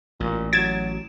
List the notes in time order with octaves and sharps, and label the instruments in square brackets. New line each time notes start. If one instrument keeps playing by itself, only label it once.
[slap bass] A1 [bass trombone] A#2
[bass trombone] F#3 [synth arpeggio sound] G#6 A6 [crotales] D7 E7